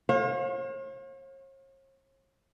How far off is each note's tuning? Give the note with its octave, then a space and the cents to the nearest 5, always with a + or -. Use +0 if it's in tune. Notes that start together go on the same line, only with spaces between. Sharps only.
C#5 -45 F5 +35